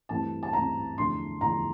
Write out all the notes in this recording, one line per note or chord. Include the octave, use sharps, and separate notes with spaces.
G2 E3 A3 C4 A5
A5
G2 E3 A3 C4 A#5
E2 D3 F3 A3 D4 C6
E2 D3 F3 A3 D4 A#5